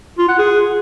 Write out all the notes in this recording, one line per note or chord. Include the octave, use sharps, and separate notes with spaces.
F4
F#5
G#4